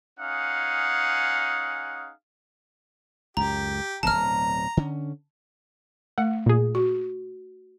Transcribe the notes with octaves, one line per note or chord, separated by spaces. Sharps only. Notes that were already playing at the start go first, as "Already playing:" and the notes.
C#4 D#4 G#4 F5 F#5
C#2 F#2 G4 A#5
D1 G1 B2 A5 A#5 F6
D3 C#4
A3 F#5
A#2 G#4
F#4